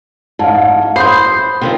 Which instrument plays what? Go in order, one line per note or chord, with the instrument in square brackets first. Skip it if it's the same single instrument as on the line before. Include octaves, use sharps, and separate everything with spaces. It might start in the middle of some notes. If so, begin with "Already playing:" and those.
[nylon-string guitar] G#2 [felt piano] F5 A5
[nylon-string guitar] C5 [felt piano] B5 D#6 G6 [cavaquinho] C6
[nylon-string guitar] C3 D#3 F3